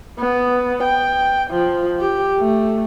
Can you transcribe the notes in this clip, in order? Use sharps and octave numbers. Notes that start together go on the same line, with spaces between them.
B3
G5
F3
G4
A3